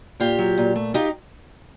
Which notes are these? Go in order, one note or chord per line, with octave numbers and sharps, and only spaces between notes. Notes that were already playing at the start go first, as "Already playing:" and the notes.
A#2 F4 G4
F#3
A#2
A3
D#4 F4 G4